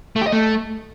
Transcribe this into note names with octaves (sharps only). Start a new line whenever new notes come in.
A3
G4
D#5
A3